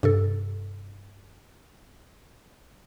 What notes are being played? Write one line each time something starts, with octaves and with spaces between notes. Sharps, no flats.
G2 C3 A4